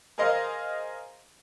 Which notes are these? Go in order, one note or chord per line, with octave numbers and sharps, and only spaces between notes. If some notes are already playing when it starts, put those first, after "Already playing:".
G#4 A#4 C5 D#5 F5